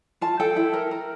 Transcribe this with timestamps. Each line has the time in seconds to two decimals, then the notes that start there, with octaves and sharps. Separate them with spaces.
0.21 F4 A5
0.40 A4 G5
0.56 E4
0.73 A#4
0.91 A#4